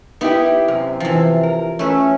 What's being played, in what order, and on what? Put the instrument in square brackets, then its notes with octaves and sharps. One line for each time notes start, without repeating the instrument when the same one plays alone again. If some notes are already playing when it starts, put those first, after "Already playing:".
[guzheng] B3 [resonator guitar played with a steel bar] D#4 E4 G4
[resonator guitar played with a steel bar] F#2 [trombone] C3
[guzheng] E3 F3
[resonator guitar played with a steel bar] A#4
[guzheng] A3 B4 [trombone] C#4